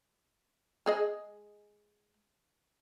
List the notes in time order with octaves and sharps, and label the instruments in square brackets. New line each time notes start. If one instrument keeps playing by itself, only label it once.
[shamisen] G#3 G#4 D#5